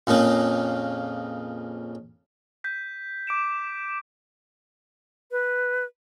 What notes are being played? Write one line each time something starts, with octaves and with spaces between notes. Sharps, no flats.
F2 A#2 C#3 A#3
G6 B6
D6 D7 E7
B4